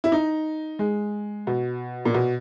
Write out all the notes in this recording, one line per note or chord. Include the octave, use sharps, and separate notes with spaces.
E4
D#4
G#3
B2
A#2
B2